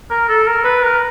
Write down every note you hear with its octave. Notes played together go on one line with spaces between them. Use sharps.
A#4
A4
A#4
B4
A#4